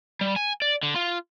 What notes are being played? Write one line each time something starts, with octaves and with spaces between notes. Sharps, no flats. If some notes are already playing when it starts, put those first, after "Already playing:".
G3
G#5
D5
D3
F4